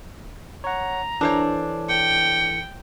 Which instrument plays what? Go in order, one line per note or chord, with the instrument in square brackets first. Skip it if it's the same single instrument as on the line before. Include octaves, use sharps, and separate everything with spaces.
[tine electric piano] C#5 F#5 [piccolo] A#5
[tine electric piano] E3 A4 [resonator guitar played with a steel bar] D4 C5 C#5
[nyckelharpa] G5 [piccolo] C#7